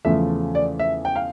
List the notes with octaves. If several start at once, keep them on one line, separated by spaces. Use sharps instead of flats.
E2 C#3 F3 A3 E5
D5
E5
G5
F5